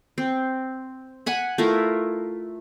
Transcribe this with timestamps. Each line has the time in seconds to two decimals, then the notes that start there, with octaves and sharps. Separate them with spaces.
0.18 C4
1.26 F#5 G#5 B5
1.58 A3 E4 F4 A#4